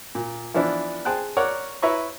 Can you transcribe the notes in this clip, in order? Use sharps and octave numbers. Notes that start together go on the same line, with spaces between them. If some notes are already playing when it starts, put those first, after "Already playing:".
A#2
E3 F3 B3 D4 E4
G#4 C5 G5 A5 F#6
A#4 C#5 D5 F#5
E4 B4 C#5 E5 A#5 C#6